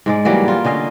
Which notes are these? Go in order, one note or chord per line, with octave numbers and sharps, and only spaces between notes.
G#2 G#3 D5
E3 F#3 G3 A#3
F4
D3 C#4 D#5 F5